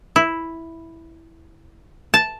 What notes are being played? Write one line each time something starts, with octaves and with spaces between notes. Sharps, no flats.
E4
A5